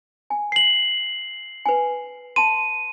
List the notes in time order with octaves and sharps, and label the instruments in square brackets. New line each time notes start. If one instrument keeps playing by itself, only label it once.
[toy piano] G#5
[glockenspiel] C7 F#7
[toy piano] B4 G#5
[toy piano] A5 C6 [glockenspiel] D#7